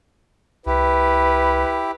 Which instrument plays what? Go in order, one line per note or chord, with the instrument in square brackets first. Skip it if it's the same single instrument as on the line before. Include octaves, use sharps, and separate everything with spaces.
[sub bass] C2 [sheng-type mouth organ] E4 G4 [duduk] B4